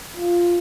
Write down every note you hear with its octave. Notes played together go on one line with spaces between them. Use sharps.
F4